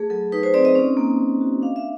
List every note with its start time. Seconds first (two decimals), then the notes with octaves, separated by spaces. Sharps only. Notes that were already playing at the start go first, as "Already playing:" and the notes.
Already playing: A3 G#4
0.10 F#3 A4
0.32 D#4 B4
0.43 C5
0.54 C4 D5
0.65 D#5
0.75 C#4
0.97 A#3
1.19 A#3
1.41 F#4
1.62 D4 F5
1.76 E5